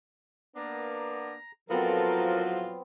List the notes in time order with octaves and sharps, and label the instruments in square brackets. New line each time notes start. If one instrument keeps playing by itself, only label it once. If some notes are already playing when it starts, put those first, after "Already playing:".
[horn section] A#3 B3 D4 [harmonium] A#5
[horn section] A2 F3 [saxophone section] F#3 F4 [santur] B3 C4 [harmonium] A4 A#4